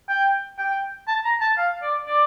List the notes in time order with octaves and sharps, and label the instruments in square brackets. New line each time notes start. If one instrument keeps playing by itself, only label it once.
[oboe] G5
G5
A5
A#5
A5
F5
D5
D5